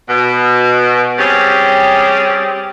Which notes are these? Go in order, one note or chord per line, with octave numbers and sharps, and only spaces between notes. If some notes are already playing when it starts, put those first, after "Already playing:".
B2
G3 C4 C#4 G4 G#4